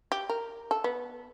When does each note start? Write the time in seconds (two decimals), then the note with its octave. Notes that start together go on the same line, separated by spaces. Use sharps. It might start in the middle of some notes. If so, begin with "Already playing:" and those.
0.12 G4
0.29 A#4
0.71 A4
0.84 B3